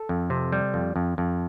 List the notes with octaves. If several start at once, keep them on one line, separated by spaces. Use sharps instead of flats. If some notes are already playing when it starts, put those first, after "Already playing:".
Already playing: A4
F2
C3
G3
F2
F2
F2